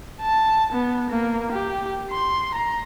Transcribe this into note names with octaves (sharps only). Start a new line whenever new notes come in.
A5
B3
A#3
G4
C6
A#5